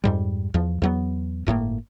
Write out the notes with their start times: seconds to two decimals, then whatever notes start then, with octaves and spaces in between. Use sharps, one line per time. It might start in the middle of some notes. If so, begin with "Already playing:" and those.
0.04 F2 G#2 G3
0.54 E2 F3
0.82 E2 F#3 B3
1.47 G1 A2 D3 A#3